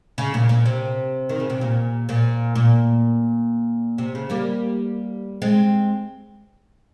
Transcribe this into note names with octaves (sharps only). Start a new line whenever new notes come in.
C#3
A#2
A#2
C3
D#3
C#3
C3
A#2
A#2
A#2
C3
C#3
G3 A#3
G#3 C4